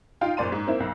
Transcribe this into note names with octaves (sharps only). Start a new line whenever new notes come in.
D#4 F4 F5 G5
F#1 A#2 D5 C6 D#7
G#2
A#3 C4 E4
B1